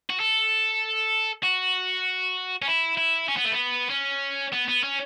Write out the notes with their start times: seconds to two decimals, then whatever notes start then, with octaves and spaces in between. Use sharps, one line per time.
0.10 F#4
0.20 A4
1.43 F#4
2.62 C#4
2.68 E4
2.97 E4
3.28 C#4
3.37 B3
3.45 A3
3.52 B3
3.90 C#4
4.53 B3
4.68 B3
4.84 C#4